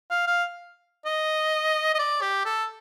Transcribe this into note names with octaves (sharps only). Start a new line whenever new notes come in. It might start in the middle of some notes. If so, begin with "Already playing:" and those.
F5
F5
D#5
D#5
D5
G4
A4